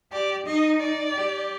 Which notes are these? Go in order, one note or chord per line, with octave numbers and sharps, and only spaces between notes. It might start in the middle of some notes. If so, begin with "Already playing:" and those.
G4 D5
D#4 D#5
D5
G4